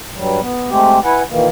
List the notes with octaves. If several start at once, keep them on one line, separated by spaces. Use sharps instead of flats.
G2 F#3 G3
B3
G#3 A3 C4 G4
E4 B4 F#5 G#5
A#2 D#3 E3 A#3